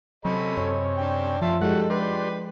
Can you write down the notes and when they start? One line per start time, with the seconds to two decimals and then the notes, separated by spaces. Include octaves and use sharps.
0.25 C3 F#3 C#4 A4 D#5 B5
0.57 F#2 C#5
0.98 D4 G5
1.41 F3 F4 E5 A5
1.61 G3 G#3 D#4 F#4 A4 F#5
1.90 D4 G4 B4 C6